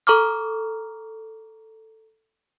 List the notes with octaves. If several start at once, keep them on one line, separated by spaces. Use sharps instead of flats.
A4 A#5 C#6 D6 F6